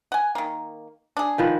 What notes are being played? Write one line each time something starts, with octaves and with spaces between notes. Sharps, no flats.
F#5 G#5
D#3 A#3
D4 G#4
D#3 F3 B4